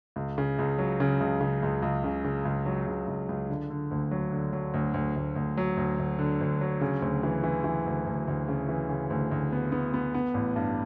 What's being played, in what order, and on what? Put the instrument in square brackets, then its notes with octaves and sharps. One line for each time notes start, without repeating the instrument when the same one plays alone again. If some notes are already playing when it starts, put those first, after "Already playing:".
[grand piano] C#2
C#3
C#2
F#3
C#3
C#2
C#3
C#2
C#2
C#3
C#3
C#2
F#3
C#2
C#2
C#2
D3
D3
D2
F#3
D3
F#3
D2
D2
D2
D2
F#3
D2
D2
D3
D2
F#3
C#3
D2
E3
E3
E3
D2
D2
D2
C#3
E3
C#3
D2
D2
B3
B3
B3
B3
A1
G2